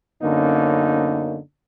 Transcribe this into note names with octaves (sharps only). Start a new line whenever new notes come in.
F#2 D3 A#3 B3 C#4 D#4